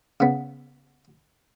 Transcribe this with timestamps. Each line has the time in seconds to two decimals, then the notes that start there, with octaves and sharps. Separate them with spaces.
0.20 C#3 B3